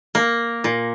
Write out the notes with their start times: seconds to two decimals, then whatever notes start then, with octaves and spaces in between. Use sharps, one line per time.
0.15 A#3
0.64 A#2